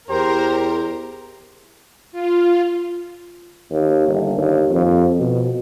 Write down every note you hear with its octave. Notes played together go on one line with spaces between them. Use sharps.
E2 G4 A#4 C5
F4
D#2
G1
D#2
F2
B2